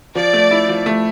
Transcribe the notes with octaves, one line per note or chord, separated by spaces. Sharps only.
F3 D5
A3
E4
F3
A3